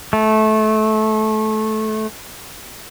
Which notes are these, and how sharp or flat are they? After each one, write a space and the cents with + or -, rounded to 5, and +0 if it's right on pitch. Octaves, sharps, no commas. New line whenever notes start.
A3 -20